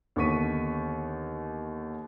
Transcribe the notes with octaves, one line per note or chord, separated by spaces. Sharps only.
D#2 D3 B3 C#6 B6 D#7